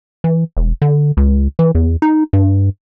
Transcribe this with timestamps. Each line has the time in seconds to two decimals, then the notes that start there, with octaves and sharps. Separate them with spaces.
0.24 E3
0.57 E1
0.82 D3
1.17 C#2
1.59 E3
1.75 E2
2.02 D#4
2.33 G2